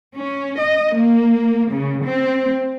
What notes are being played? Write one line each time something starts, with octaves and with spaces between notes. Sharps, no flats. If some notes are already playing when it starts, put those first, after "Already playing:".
C#4
D#5
A#3
C#3
C4